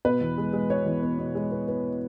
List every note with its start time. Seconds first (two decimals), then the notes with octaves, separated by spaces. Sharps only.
0.05 B2 B4
0.21 E2
0.38 G#3
0.53 G#3
0.70 B3 C#5
0.86 E2
1.02 B3
1.19 B2
1.35 G#3
1.52 B3
1.68 B3